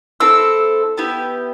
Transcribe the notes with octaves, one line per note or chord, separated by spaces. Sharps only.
C4 E4 A4 E6
B3 E4 G4